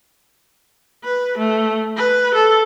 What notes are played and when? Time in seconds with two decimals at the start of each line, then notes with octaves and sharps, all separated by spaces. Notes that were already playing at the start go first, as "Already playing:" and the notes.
1.04 B4
1.38 A3
1.97 B4
2.34 A4